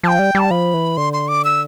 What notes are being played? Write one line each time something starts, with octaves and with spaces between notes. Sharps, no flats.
F3 G5 A5
G3
G3 A5
F3 B5
E3
D3 C6
C6
D6
E6